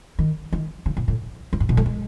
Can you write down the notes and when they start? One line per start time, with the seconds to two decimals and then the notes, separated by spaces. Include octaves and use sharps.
0.19 D#3
0.52 D#3
0.86 C#3
0.97 B2
1.08 A2
1.53 F#2
1.60 G#2
1.69 B2
1.77 A3
1.86 G#3